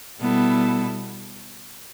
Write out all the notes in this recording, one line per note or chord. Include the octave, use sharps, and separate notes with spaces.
B2 G3 B3 E4 A4